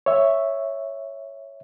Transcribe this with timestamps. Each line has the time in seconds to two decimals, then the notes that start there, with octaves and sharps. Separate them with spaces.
0.06 C#5 E5